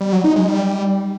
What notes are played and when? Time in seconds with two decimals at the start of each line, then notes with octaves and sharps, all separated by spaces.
0.01 G3
0.12 F#3
0.24 D#4
0.36 G#3
0.48 G3